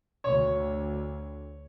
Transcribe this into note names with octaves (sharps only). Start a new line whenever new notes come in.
D2 C#5